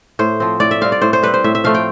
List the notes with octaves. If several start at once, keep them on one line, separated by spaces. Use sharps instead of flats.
A2 C5
F3 C4
A2 D5
E5
G3 C4 F5
D5
A2 C5
C5
G3 C4 B4
C5
A2 E5
E5
F3 A3 C4 F5
G5